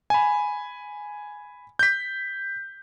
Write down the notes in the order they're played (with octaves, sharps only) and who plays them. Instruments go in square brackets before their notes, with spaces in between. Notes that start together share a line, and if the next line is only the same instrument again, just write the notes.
[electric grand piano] G#5 B5
G6 B6